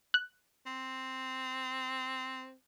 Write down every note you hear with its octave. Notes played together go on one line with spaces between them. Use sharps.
F#6
C4